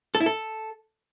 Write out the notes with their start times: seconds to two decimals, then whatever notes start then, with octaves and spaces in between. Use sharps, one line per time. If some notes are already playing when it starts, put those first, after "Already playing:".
0.15 A4
0.20 E4
0.26 A4